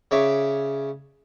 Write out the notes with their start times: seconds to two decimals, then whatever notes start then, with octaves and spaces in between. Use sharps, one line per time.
0.11 C#3 C#5 D5 E5 D6